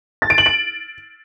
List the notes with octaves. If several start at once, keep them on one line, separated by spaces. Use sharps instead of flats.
A6
D7
F#7
D7